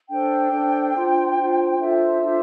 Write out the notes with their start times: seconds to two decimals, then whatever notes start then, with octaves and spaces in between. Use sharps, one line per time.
0.09 D4 A4 C5 G5
0.52 D4 A4 C5
0.93 D4 F4 C5
1.35 D4 F4 C5
1.78 D4 F4 A4 C5 E5
2.21 D4 F4 A4 C5